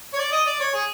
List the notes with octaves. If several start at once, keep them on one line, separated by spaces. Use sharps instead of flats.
C#5
D5
D#5
D5
C#5
G#4